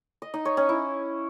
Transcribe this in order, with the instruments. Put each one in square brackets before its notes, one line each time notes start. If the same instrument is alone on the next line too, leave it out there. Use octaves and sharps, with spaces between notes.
[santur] D#5
D#4
C#5
C#4
E4